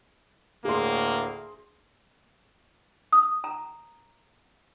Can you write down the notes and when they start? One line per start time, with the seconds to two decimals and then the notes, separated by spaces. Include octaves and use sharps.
0.65 D2 A2 A#3 G#4 C6
3.12 D#6
3.44 A#5